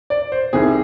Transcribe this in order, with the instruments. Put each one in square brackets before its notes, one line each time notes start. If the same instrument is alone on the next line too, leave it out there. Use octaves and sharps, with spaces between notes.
[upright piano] D5
C5
C2 C3 D#3 G#4